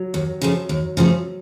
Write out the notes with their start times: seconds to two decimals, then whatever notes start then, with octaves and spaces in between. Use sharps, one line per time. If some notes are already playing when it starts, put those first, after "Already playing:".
Already playing: F#3
0.14 D#2
0.41 C#3 F3 A3
0.69 D#2
0.97 C#3 F3 A3